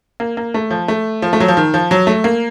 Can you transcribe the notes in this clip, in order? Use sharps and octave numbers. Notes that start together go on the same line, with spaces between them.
A#3
A#3
A3
F3
A3
F3
A3
F#3
F3
D#3
F3
F#3
A3
A#3